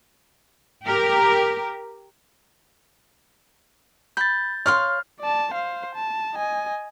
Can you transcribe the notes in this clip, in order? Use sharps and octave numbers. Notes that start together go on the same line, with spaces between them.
G4 A#4
B5 G6 A6
C#5 F5 C6 F6
D5 A5
C5 F5
A5
D#5 G#5